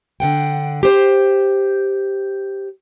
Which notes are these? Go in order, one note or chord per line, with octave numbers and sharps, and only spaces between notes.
D3 F#5 G5
G4 C5